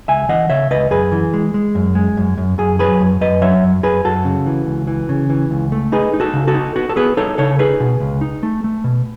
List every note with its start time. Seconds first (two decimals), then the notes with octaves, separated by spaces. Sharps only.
0.08 C#2 E5 G#5
0.29 E3 D#5 F#5
0.50 C#3 C#5 E5
0.71 C#2 B4 D#5
0.91 F#2 G#4 B4
1.12 E3
1.34 G#3
1.54 G#3
1.75 F#2
1.95 G#3
2.17 F#2
2.38 F#2
2.58 F#2 G#4
2.79 F#3 G#4 B4
3.01 F#2
3.21 F#2 B4 D#5
3.42 F#3 C#5 E5
3.63 F#2
3.83 F#2 G#4 B4
4.05 F#2 F#4 A4
4.25 C#3
4.46 E3
4.67 C#2
4.87 E3
5.09 C#3
5.30 E3
5.51 C#2
5.72 A3
5.92 D#4 G#4 B4
6.14 D#4
6.20 F#4 A4
6.33 C#3
6.48 F#4 A4
6.54 D#4
6.76 B3 F#4
6.89 A4
6.96 B3 G#4 B4
7.17 D#4 A4 C#5
7.38 C#3 A4 C#5
7.59 D#4 G#4 B4
7.80 B2
8.00 C#2
8.21 D#4
8.43 A3
8.64 A3
8.84 B2